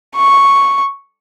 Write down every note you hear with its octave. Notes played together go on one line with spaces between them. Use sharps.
C#6